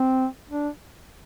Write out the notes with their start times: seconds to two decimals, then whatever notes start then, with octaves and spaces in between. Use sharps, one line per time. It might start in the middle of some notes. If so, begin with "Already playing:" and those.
Already playing: C4
0.50 D4